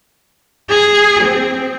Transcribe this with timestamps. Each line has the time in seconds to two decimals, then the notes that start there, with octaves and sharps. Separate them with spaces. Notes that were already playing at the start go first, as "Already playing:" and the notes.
0.69 G#4
1.23 C4